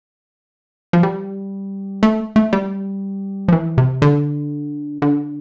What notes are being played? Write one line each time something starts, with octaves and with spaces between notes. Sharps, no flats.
F3
G3
A3
A3
G3
F3
E3
C3
D3
D3